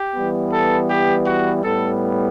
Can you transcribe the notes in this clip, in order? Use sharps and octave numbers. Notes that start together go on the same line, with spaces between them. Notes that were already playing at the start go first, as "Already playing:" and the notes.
Already playing: G4
E3 G3 B3
A4
G4
F#4
A2 G3 B3 A4